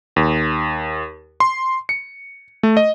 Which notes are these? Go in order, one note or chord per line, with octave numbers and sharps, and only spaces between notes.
D#2
C6
C#7
A3
D#5